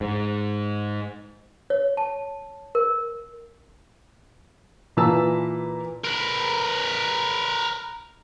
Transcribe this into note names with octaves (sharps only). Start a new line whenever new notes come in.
G#2
C#5
A5
A#4
A#2 E3 B4 A5 E6
A#4 B4